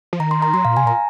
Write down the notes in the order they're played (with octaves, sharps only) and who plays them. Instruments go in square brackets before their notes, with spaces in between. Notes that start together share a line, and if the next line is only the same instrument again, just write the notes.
[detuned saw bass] F3
[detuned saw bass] D#3 [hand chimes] A#5
[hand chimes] C6
A#5
[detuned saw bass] F#3 [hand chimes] C6
[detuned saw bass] A#2 [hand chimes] F5
[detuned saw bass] C3 [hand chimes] G#5
[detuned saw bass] A#2
[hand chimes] A#5